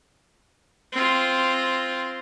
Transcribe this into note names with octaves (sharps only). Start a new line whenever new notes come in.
C4 F4